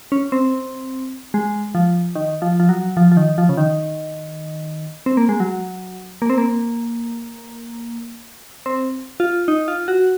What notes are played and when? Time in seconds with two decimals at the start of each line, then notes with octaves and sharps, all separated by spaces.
0.12 C#4
0.32 C4
1.34 G#3
1.75 F3
2.15 D#3
2.42 F3
2.60 F3
2.69 F#3
2.97 F3
3.12 F3
3.17 D#3
3.38 F3
3.49 C#3
3.57 D#3
5.06 C4
5.17 A#3
5.29 G#3
5.40 F#3
6.22 A#3
6.30 C4
6.38 A#3
8.66 C4
9.20 F4
9.48 D#4
9.68 F4
9.88 F#4